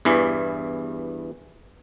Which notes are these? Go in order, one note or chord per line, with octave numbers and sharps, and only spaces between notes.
E2 G2 E3